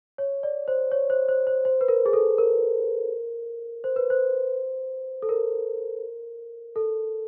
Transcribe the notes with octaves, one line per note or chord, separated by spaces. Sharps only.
C#5
D5
C5
C#5
C5
C5
C5
C5
B4
A#4
G#4
A4
A#4
C5
B4
C5
A4
A#4
A4